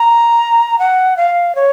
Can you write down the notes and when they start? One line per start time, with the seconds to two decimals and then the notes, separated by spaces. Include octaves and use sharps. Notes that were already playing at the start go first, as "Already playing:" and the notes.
Already playing: A#5
0.79 F#5
1.17 F5
1.55 C#5